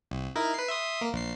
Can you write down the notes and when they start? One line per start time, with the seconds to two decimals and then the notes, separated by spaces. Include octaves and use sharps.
0.11 C2
0.36 D#4 E4 A#4
0.54 B4 C7
0.68 E5 C6 D#6
1.01 A#3
1.13 A#1 C7